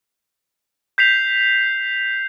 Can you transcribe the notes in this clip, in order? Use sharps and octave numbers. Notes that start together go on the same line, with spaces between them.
G6 B6 C7 F7